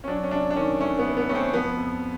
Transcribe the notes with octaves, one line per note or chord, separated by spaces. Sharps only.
C#4
F#3 D4
C#4
C3 D4
D4
D#3 C#4
A3 C#4
B3
C3
B3
A3 C#4
C4
F3 B3
F2